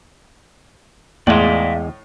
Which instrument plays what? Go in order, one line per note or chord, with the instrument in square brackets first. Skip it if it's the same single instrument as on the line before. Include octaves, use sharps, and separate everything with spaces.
[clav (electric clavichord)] E2 G#3 [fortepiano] A2 [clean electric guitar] D5 F5 C6